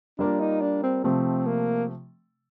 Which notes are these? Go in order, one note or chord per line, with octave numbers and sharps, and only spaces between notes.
G3 A#3 D4 F4 A#4
D#4
D4
C4
C3 F3 A3 C4
A#3